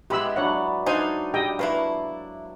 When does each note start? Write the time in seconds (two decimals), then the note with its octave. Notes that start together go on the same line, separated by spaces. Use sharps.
0.10 G#3 B3 E4 G4 B5 E6
0.36 F#3 D4 B4 C#5 D5 F#5
0.86 D4 D#4 C5 F5 G#5
1.34 G4 D#5 G5
1.59 A3 A#3 E4 B4 F5